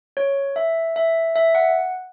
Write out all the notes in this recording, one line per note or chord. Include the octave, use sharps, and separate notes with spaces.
C#5
E5
E5
E5
F#5